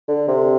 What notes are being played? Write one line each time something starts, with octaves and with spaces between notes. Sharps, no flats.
D3
C3